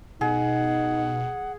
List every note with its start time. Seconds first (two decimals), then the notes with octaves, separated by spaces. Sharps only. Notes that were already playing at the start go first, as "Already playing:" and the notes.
0.21 B2 D#4 G#4 F#5